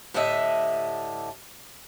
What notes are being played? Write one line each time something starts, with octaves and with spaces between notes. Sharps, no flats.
A2 D3 D4 G4 D#5 E5